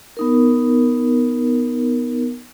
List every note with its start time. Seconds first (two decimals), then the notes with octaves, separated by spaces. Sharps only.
0.17 B3 D#4 A#4